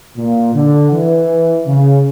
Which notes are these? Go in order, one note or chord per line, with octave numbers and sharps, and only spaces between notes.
A#2
D3
E3
C#3